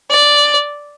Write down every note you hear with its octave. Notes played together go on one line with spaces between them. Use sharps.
D5